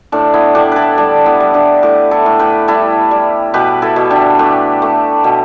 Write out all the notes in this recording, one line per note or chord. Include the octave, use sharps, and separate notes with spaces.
A2 D4
B3 E4
A2 D4 G4
E4 A4 B4
G3 D4 G4
B3 E4
G3
D4 G4
A2 G4 B4
E4 A4
A2
G4 B4
G3 E4 A4
G3
B2 G4 B4
E4 A4
B2
D4 G4
A3 G4 B4
A3
B2